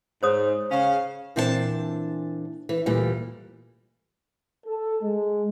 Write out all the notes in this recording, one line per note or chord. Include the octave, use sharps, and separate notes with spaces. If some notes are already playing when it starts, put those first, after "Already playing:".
G#2 C5 C#5 D#6
C#3 C#4 F5
A#2 E3 C4 D4 C#5 A5
E3
D2 A#2 E3 G3
A4
G#3